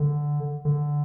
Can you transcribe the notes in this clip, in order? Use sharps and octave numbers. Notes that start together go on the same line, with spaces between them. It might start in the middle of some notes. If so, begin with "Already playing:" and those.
Already playing: D3
D3